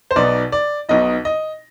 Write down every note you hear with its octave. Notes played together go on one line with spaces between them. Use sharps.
C5
B1 B2 B3 D#4 D5
D5
B1 B2 B3 D#4 D#5
D#5